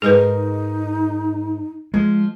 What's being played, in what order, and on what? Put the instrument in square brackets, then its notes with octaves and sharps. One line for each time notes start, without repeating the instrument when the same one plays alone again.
[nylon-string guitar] G#2 A#4 D#5 [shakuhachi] D#4 [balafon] G#4 B4
[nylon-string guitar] F3 [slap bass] G#3